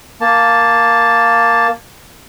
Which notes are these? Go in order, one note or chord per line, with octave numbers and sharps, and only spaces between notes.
A#3 A5